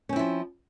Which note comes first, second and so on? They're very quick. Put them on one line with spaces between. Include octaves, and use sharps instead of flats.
C#4 C4 E4 F3